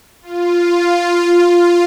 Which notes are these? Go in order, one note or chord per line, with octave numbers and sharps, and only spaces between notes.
F4
F4